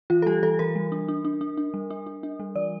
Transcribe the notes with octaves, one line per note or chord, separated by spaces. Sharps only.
E3 F4
A4
G3 G4
E3 A4
E3 A#4
G3
D4
D4
D4
D4
D4
G3
D4
D4
D4
G3
E3 D5